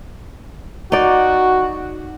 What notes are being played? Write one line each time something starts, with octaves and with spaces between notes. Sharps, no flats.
D#4 F#4 D5